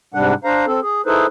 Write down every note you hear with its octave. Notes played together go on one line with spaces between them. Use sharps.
G#2 C3 G3 D4 F#5
D4 C5 F5 A#5
C4 A4
G#4
D#4 E4 G#4 A4 B4 C5